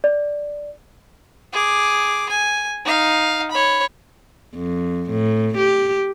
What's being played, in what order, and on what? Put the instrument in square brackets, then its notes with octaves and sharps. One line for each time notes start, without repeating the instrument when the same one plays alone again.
[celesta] D5
[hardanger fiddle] G#4 D6
G#5
D#4 F5
C#5 B5
[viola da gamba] F2
A2
G4